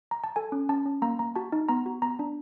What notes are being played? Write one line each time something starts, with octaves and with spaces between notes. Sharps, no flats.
A#5
A5
A4 G#5
C#4
C#4 A5
C#4
A#3 A#5
A#3 A#5
F#4 A5
D#4
B3 A#5
F#4
B3 A#5
D4